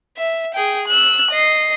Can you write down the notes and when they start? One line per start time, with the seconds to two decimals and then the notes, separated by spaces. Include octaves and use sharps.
0.18 E5
0.54 G#4 G5
0.87 E6 F#6
1.32 D#5 C7